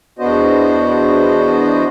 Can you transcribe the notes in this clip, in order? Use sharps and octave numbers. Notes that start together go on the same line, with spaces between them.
E2 B3 D4 F#4 C5 D#5